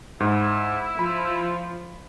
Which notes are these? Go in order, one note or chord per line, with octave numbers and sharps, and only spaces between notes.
G#2 E4
F3 B5